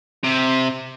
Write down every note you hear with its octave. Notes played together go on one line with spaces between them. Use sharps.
C3